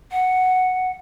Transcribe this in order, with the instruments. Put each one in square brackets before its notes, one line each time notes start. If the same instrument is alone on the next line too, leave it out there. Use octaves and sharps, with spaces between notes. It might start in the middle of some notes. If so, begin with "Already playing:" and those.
[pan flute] F#5